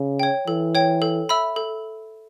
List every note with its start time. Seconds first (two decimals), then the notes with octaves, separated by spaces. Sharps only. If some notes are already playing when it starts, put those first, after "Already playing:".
Already playing: C#3
0.20 C#5 G5
0.47 E3 A4
0.75 C#5 G5
1.02 A4
1.29 E5 B5 E6
1.56 A4